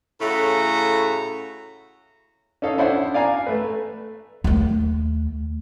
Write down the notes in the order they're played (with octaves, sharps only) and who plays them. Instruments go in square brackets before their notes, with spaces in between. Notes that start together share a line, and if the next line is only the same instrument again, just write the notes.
[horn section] A2 C#3 A3 F#4 A#5
[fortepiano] C#4 D#4 A4 F5
C#4 D4 E4 C5 F#5
D5 F5 G#5 A#5
A3 B4
[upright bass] D#2 A3